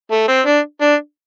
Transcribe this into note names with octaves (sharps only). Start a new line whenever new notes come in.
A3
C4
D4
D4